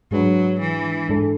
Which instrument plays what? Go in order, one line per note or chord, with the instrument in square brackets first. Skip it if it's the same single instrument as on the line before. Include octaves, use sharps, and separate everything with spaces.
[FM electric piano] G#2 G#3 D4 G#4 B4 [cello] F#3
[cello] E3
[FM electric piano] G#2 G#3 D4 A4